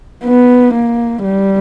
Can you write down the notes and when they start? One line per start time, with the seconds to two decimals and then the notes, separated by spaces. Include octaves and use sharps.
0.25 B3
0.74 A#3
1.24 G3